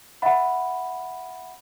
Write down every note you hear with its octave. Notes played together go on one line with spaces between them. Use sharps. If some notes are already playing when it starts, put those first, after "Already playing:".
E5 F#5 B5